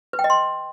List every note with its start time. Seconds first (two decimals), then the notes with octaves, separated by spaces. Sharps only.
0.13 B4
0.19 G5
0.24 D#5
0.30 C6